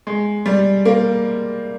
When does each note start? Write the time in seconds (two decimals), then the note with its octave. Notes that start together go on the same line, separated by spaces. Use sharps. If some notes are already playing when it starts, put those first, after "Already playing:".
0.07 G#3
0.46 G3
0.85 A#3